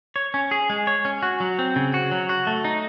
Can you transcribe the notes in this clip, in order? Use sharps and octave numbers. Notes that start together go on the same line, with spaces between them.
C#5
C#4
G#4
G#3
C#5
C#4
F#4
F#3
C4
C#3
F#4
F#3
F#4
A3
D#4